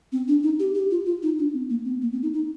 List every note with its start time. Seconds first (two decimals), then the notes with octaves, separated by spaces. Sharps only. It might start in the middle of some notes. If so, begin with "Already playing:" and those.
0.12 C4
0.28 D4
0.43 D#4
0.59 G4
0.75 G4
0.91 F4
1.06 F4
1.23 D#4
1.39 D4
1.54 C4
1.70 A#3
1.85 C4
2.02 A#3
2.12 C4
2.23 D#4
2.34 D#4